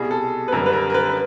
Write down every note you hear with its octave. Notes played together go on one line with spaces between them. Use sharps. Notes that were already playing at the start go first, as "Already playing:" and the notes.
Already playing: C2 B2 G3 G#4
A4
B4
F#2 D3 G3 A#4
B4
A#4
A#4
B4
B4